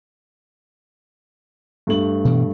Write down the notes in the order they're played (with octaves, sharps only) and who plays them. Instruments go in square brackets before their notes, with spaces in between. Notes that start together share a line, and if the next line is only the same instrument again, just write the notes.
[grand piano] G2 A3 F#7
[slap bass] B2 E3 G3